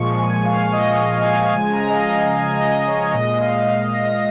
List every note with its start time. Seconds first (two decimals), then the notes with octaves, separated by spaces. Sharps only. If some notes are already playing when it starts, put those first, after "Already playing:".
Already playing: A#2 F3 G#3 C#6
0.19 G#5
0.45 F5
0.72 D#5
1.13 F5
1.22 G#5
1.33 F5
1.52 C#3 F3 G#3 G#5
1.73 A#5
1.89 D#5
1.93 F5
2.13 F5
2.33 G#5
2.60 D#5
2.87 C#5
3.14 A#2 G#3 D#5
3.41 F5
3.94 A#6